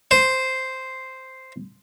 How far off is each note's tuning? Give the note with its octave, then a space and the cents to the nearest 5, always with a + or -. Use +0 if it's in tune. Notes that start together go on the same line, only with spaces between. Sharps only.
C5 -5